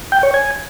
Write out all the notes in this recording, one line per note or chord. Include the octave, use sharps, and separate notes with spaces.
G5
C#5
G#5